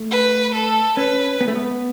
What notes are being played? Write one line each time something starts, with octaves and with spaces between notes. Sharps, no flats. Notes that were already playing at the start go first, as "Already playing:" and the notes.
Already playing: A3
B4
A4
C#4 B4
B3
A3
B3